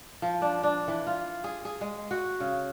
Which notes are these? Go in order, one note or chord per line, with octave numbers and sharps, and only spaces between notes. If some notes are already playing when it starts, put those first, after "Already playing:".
F3
D4
D4
E3
F4
G#4
G#4
G#3
F#4
C#3